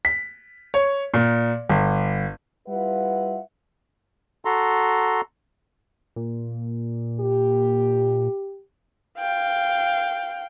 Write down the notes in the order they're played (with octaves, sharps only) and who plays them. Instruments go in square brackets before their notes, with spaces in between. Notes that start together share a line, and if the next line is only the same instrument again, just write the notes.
[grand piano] B6
C#5
A#2
G1
[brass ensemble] G3 E4 F4 B4 E5 F#5
[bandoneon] F#4 A4 A#5 C6
[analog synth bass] A#2
[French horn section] G4
[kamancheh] F5 G5